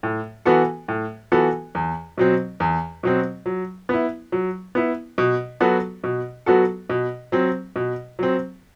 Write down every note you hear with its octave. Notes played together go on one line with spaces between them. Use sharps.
A2
E3 B3 F#4 A4
A2
E3 B3 F#4 A4
E2
B2 F#3 C4
E2
B2 F#3 C4
F#3
B3 E4
F#3
B3 E4
B2
F#3 B3 F#4 A4
B2
F#3 B3 F#4 A4
B2
F#3 C4
B2
F#3 C4